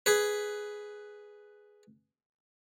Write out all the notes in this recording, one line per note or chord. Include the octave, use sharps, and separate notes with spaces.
G#4 B4